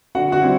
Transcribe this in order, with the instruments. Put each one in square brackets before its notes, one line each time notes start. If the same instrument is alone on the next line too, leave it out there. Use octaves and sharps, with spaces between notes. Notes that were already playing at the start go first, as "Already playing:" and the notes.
[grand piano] D3 F#4 F#5
F#4 F#5
G3 C4 E4